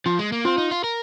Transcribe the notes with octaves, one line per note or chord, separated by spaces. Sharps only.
F3 F4
G#3
A#3
C4 F4
D#4
F4
A#4